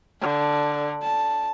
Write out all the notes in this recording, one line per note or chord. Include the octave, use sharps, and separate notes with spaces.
D3
A5